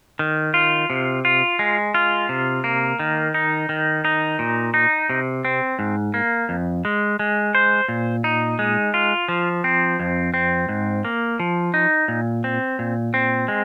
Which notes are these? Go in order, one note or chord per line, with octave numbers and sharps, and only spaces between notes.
D#3
F4
C3
F4
G#3
F4
C3
A#3
D#3
D#4
D#3
D#4
A#2
D#4
C3
C4
G#2
A#3
F2
G#3
G#3
C5
A#2
D#4
G#3
F4
F3
C4
F2
C4
G#2
A#3
F3
D#4
A#2
C4
A#2
C4
G#3